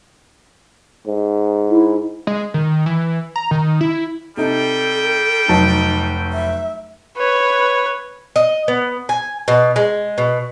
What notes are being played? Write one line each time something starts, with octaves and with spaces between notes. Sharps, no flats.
G#2
E4
G#3
D#3
E3
A#5
D#3
E4
C3 G3 D#4 A4 G5
F1 F#3 D#4 A5
E5
B4 C#5
D#5
B3
G#5
B2
G#3
B2